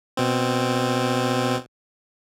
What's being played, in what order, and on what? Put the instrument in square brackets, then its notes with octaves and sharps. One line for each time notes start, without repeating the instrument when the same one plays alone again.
[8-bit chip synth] B2 C4